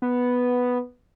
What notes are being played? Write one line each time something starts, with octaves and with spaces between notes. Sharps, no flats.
B3